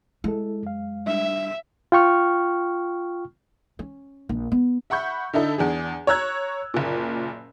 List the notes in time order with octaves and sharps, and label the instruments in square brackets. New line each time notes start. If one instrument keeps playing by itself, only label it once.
[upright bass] G#3 [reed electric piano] E4 A4
[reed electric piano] F#2 F5
[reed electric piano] G3 D4 [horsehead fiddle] E5
[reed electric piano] F4 G5 C#6 F6
[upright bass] C#4
A#1
B3
[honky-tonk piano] E5 F#5 B5 C#6 G6
D3 D#4 E4 A4
E2 D4 G#4
C#5 A#5 E6 F#6 G#6
F#1 A#2